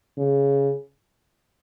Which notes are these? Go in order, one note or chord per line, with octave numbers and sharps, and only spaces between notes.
C#3